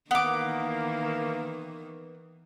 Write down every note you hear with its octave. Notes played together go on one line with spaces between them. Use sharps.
D#3 E3 A#3 B3 F#5 D6